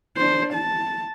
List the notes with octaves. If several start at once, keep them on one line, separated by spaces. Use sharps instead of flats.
D4 C5
A5